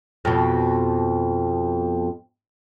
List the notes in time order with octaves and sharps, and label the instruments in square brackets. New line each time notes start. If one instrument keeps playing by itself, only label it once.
[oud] F2 B2